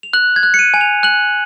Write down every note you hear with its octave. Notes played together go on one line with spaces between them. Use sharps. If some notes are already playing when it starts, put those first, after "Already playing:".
F7
F#6 F#7
G#6
F#6
C#7
D#7
G#5
F7
F#6 F#7